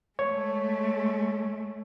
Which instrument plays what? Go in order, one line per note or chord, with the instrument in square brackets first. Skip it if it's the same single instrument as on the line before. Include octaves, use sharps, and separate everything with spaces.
[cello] G#3 A3 [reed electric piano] C#5